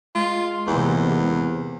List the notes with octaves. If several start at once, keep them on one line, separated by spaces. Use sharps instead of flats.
G#3 F4
E2 C3 E3 A#3